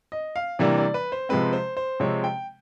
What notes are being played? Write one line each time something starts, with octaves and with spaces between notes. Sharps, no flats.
D#5
F5
C3 E3 G3 A#3 D4 D5
D5
B4
C5
C3 F3 G#3 C4 B4
C5
C5
C3 F3 G#3 C4 C#5
G5